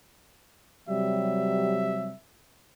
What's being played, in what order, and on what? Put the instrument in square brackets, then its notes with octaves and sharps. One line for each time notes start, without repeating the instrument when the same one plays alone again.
[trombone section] C3 F#3 G3 [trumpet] E5